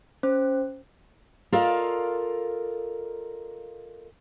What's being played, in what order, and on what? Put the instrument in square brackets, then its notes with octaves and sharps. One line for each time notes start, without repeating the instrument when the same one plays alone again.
[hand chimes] C#4 C5
[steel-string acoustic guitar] F4 A4 A#4 D5 D#5 F5